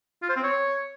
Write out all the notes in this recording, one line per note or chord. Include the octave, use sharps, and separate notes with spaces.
F4
C5
C4
C#5